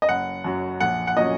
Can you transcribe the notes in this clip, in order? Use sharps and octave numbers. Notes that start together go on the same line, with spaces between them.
D#5
F#1 F#5
F#2 F#3
A#1 F#5
F#5
A#2 F#3 C#4 D#5